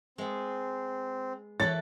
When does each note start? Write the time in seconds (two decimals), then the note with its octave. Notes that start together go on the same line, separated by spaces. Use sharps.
0.18 G#3 B3 C4
1.60 E3 A4 B4 C#5 A6